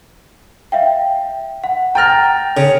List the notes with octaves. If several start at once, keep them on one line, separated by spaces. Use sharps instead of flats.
E5 F5 G5
F#5
G5 A#5 F6 A6 A#6
C#3